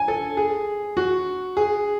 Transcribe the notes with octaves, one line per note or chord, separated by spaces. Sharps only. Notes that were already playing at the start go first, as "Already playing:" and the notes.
Already playing: G#5
A4
G#4
F#4
G#4